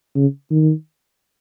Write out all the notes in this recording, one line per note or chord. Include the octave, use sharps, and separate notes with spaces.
C#3
D#3